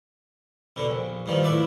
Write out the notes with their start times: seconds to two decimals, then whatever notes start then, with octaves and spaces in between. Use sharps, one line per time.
0.76 B2 D3
0.90 A#1
1.26 G2 D#3 F3
1.43 A2 B4 D5 E5